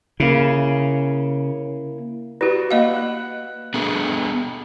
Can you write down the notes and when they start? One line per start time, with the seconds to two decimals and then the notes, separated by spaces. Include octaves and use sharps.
0.20 C#3 A#3 E4
2.41 E4 F#4 G4 B4 D5
2.71 A#3 D#5 F5 F#5 B5 E6
2.96 F#6
3.74 B3 D4 G#4 A4